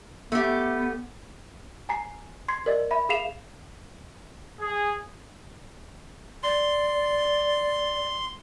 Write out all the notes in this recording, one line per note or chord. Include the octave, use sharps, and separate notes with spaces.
A3 B3 G4
G#5 A#5 C7
C6 G#6 C7
A#4 D5 D#5
E5 B5
G#4 E5 F5 C7 E7 F7
G#4
D5 C6